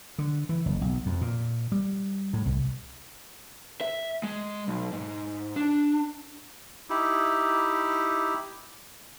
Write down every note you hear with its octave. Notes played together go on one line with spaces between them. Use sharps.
D3
E3
F#1
B1
F2
A#2
G3
A2
C2
E5
G#3
B1
G#2
D4
D#4 E4 G4